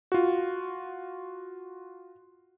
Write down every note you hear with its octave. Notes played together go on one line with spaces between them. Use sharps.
F4 F#4